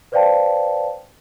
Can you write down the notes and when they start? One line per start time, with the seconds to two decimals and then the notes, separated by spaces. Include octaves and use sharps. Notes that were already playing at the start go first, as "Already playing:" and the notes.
0.12 B4 C5 D5 F5 G5 A5